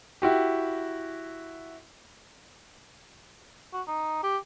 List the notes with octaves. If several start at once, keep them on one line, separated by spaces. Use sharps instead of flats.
E4 F#4 G4
F#4
D#4
G4